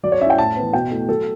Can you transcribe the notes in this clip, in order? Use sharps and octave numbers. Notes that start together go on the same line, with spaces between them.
F#3 D5
C#5
C#4 E4 E5 G5
A2 A5
E3 B3
B2 G5
A3 E4
F#3 A4